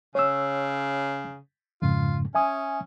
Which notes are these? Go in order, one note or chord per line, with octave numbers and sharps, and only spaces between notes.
C#3 C#5 E6
F2 G#2 C#3 F4
C#4 E5 G#5 D#6